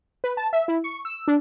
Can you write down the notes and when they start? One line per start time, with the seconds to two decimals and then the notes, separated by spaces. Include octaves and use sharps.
0.24 B4
0.37 A5
0.53 E5
0.68 E4
0.84 C#6
1.05 E6
1.28 D4